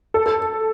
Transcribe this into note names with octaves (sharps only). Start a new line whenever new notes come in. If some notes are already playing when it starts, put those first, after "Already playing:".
A4
A4